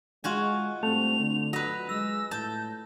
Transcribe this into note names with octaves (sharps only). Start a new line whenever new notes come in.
G#3 F4 F#4 G#5
G2 A3 C4 F7
D3
F#3 B4 D#5
G#3 E6 A#6
A2 A5 G6